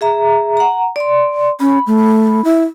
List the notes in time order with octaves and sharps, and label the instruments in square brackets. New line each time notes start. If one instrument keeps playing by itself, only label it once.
[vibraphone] G#4 E5 A#5
F#5 A#5
D5 C6
[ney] C#4 [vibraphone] B5
[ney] A3
E4